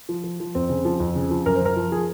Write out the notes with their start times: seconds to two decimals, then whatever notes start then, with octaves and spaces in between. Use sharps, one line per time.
0.09 F3
0.24 F3
0.40 F3
0.55 F2 C4
0.70 C#3
0.85 F3
1.00 F2
1.16 C#3
1.31 F3
1.46 F#2 A#4
1.56 C5
1.62 F#2 A#4
1.76 F3
1.92 F3 G#4